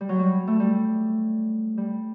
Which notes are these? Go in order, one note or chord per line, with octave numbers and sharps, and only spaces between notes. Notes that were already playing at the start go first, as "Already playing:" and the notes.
G3
F#3
G3
A3
G3
G3